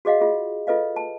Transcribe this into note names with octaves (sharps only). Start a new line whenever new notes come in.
F#4 G#4 D#5 F5 F#5
F4 G#4 D#5
F4 A4 B4 D#5 F5
A5